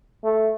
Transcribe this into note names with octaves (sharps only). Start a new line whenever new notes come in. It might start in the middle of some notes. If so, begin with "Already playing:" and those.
A3